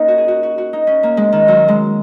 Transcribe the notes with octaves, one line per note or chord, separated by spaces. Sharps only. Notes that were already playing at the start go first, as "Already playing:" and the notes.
Already playing: A#3 C#4 D#4
F#4
G#4
F#4
F#4
F#4
D#4
C#4
A#3
G#3
D#3
F#3
G#3